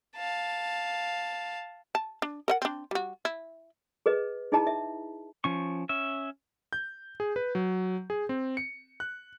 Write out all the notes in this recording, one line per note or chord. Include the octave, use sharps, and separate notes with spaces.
F5 A5
A5
D4
A#4 D#5 F#5
C4 D4
G3 F#4
E4
G#4 B4 D#5
D#4 E4 G#4 D#5 A5 A#5
E5
F3 C#4 C#6
C#4 E5
G6
G#4
B4
F#3
G#4
C4
C#7
F#6